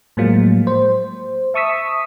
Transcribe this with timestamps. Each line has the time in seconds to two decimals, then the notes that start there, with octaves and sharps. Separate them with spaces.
0.17 A2 F3 F#3 G#3 A#3
0.67 C5
1.54 E5 A5 C#6 D#6 E6 B6